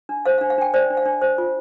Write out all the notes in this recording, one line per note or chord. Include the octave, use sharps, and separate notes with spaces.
D4
C5 F5
D4 F5
F5
D4 G5
C5 D5
D4
F5
D4
C5
F4